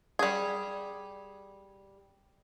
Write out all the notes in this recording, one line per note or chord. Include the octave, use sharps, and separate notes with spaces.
G3 G#4